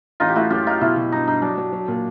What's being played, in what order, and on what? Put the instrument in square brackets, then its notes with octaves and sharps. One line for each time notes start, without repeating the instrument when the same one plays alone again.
[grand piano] A1 [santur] D#4 F4
[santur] G4
[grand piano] A3 [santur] E4 F#4
[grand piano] F#2 [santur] F4 G4
[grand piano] F#3 [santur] D#4 F4
[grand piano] B2 [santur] E4
[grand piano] B2
[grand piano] G2 [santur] D#4
[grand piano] G2 [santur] D#4
[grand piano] F#3 [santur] D4
[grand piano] F#3
F#3
A#2